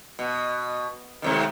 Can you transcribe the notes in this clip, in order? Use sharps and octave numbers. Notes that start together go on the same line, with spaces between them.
B2
G#2 C3 D#3